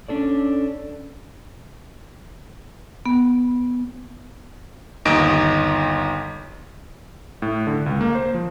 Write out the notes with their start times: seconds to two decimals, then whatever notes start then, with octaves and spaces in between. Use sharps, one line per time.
0.08 C#4 D4 A4 D5
3.06 B3
5.05 G1 D#2 D#4 D#5 D7
7.42 A2
7.67 D3
7.86 C#2
8.01 A#3
8.15 C5
8.34 F3